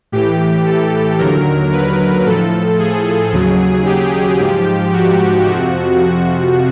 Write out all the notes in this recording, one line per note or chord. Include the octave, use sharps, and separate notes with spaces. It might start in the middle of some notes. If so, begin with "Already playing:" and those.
A2 E3 G4
A4
D#2 D3 F#3 A#4
B4
A2 F3 A4
G#4
D#2 C#3 F#3
G4
G#2 F3
F#4
F2 C3 F3 F#4
F#4